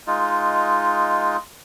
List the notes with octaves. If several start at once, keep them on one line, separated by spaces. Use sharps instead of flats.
G#3 D#4 F4